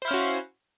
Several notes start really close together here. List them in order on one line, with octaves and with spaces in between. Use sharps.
C5 E4 F5 C#4 F#4